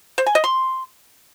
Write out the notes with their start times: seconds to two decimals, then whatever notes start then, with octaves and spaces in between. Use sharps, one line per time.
0.18 C5
0.26 G#5
0.35 D#5
0.44 C6